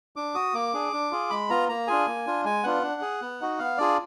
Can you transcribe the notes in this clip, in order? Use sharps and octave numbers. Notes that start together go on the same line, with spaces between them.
D4 D6
F#4 D#6
A#3 D6
D4 G#4
D4
F4 G#4
G#3 B5
B3 F4 A#5
A#3 A#5
D4 F4 G#4 G#5
A#3
D4 F4
G#3 G#5
B3 D4 F4 F#5
D4
G#4
B3
D#4 F#4
B3 F5
D4 F4 G#4 D5